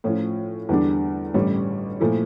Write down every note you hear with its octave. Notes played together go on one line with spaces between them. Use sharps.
A2 F3 C#4 F4
E2 D3 G3 D4
A1 G2 D3 G3 C#4
A#2 F3 A3 E4